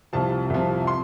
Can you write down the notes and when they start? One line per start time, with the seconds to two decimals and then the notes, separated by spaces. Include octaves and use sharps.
0.13 C2 C3 F3 A5
0.50 C2 C3 F3
0.87 C6